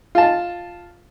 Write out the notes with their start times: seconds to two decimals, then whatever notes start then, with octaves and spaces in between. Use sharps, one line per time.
0.15 F4 A5